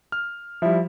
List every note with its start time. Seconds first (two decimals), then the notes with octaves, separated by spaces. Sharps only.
0.12 F6
0.62 F3 G3 E4